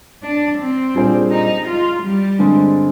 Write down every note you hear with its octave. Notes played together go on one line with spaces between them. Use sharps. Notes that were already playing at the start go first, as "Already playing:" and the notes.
D4
C4
A#2 G3 D4 G#4 C5
D#4
F4
G3
G2 D3 G#3 C4